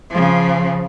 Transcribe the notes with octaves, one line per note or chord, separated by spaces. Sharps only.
C#3 F3